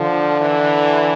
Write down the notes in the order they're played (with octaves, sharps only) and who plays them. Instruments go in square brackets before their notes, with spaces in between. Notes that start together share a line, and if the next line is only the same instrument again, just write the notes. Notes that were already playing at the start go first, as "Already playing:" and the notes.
Already playing: [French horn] D3 [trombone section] F3
[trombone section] E3